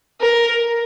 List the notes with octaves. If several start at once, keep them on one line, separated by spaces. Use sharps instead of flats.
A#4